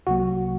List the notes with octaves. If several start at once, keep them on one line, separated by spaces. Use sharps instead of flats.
C2 C3 F#3 A#3 F#4 F#5